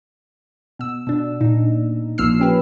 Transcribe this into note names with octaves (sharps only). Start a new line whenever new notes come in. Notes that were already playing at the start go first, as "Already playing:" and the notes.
B2 E6
B2 D4
A#2 D#4
A#1 F3 A#3 E6 F6 C7
C#4 G4 B4